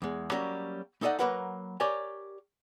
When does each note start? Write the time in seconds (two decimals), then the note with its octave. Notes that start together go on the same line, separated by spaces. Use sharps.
0.02 E2 G#3
0.31 F#3 G3 A#3 C#4 A#4
1.01 A3 D#4 A4 D5 D#5 F#5
1.19 F#3 A#3 A#4 B4 F#5 B5
1.80 G4 A#4 C#5 D5 G#5